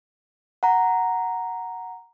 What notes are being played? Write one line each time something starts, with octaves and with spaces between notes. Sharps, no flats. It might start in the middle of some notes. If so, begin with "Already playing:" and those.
F#5 A#5